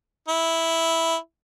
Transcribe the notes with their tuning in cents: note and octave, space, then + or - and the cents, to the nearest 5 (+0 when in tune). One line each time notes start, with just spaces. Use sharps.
E4 -5